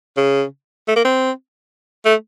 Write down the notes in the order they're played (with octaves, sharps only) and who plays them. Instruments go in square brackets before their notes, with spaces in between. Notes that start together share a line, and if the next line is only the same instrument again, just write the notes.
[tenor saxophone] C#3
A3
A#3
C4
A3